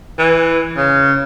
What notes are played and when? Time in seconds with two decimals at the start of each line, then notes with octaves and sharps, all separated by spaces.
0.19 E3
0.77 C#3